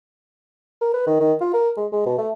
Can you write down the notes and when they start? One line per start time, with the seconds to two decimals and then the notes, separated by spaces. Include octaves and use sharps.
0.81 A#4
0.94 B4
1.07 D#3
1.20 D#3
1.41 F4
1.54 A#4
1.77 G#3
1.92 G#3
2.06 B2
2.18 A3